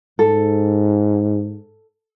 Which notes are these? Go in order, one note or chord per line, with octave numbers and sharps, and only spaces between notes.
G#2 A4